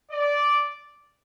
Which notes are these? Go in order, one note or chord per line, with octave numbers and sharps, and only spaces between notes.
D5